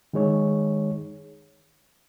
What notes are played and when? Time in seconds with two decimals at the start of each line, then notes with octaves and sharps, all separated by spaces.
0.13 D#3 G#3 D#4 G#4 C#5